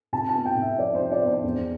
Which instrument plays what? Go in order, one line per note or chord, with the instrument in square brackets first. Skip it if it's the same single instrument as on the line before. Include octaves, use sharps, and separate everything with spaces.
[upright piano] C3 A5
A5
B3
G5
C3
E5
F3 D5
C5
C3
D5
B3
C5
E2